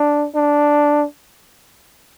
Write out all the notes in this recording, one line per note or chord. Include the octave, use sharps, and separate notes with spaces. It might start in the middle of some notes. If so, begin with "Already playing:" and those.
Already playing: D4
D4